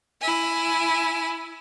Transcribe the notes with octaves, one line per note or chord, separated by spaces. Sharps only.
E4 G#5